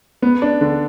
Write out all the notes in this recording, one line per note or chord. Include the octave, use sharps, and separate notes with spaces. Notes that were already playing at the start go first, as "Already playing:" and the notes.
B3
D4
D3